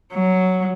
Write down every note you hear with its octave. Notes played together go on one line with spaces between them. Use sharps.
F#3